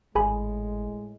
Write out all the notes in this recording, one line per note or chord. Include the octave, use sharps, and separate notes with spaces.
G#1 A2 G#3 G#4 G#5 B5